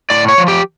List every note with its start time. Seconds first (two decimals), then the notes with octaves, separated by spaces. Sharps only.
0.10 A2 D5
0.28 C#5
0.38 F3
0.48 G4